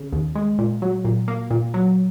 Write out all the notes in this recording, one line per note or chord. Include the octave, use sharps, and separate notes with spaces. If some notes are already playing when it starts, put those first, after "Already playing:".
Already playing: C#3
D#2
G#3
A#2
F#3
A#2
A#3
A#2
F#3